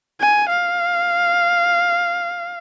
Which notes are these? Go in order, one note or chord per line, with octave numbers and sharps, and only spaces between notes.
G#5
F5